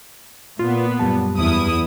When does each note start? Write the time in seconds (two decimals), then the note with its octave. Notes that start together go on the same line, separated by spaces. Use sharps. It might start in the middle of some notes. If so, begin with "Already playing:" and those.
0.59 A#2 B3 F4
0.99 F#2 G3 A5
1.37 E2 E4 D#6